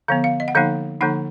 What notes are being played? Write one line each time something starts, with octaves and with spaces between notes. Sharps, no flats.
D3 F3 B3 F5
F5
D#5
F#5
D3 F3 A#3 D#4 F5
D3 F3 A#3 D#4 F#5